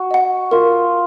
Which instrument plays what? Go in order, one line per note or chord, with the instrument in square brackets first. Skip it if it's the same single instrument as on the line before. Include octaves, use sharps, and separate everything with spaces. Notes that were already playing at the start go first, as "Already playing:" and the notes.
Already playing: [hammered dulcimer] F#4
[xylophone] D#5 F#5
[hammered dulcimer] F4 [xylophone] A#4